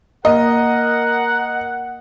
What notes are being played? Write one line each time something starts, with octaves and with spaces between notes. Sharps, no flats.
A#3 A#4 D#5 F#5